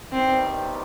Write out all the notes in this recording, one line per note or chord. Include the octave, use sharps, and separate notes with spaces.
C3 D#3 G3 B3 C4